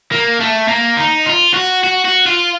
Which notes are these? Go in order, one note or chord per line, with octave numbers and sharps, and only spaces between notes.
A#3
A3
A#3
D#4
F4
F#4
F#4
F#4
F4